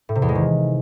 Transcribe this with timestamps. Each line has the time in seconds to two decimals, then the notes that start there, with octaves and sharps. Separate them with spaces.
0.09 A2
0.15 C3
0.22 E2
0.29 G#3
0.35 D#3